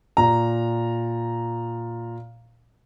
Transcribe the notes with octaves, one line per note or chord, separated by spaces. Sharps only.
A#2 A#5